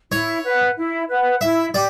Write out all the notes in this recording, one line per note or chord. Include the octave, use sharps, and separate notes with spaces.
E4 C#5
B4 F#5
E4
B4 F#5
E4 E5
G4 D5